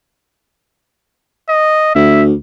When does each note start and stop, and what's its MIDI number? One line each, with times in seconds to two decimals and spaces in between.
1.49 1.93 75
1.95 2.34 38
1.95 2.23 76